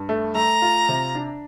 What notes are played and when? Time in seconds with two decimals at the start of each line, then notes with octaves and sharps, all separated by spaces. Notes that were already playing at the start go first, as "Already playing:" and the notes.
Already playing: G2
0.09 A3
0.35 A3 A#5
0.62 F4
0.89 C3
1.15 D4